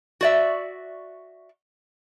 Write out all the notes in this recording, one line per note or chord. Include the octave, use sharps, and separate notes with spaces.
F#4 D5 E5